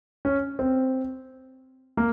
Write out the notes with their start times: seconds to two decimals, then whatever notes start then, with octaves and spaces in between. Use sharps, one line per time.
0.25 C#4
0.59 C4
1.97 A#3